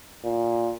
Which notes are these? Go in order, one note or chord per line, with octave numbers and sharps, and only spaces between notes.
A#2